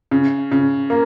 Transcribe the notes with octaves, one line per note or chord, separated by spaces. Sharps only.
C#3
C#3
A#3